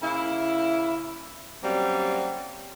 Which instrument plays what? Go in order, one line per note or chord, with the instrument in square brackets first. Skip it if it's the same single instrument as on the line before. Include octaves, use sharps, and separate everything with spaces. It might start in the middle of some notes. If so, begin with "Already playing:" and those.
[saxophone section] C#3 A#3 E4
F#3 G3 A#3 C4 C#4